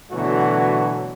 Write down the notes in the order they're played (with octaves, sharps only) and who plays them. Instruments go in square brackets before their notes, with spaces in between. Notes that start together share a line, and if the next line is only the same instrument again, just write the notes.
[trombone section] B2 D3 E3 F#3 A3 F#4